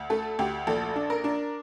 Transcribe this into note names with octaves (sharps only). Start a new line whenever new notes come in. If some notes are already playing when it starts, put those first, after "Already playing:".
Already playing: D2
A3 A4
D2 G4
A#1 A4
D4
A#4
D4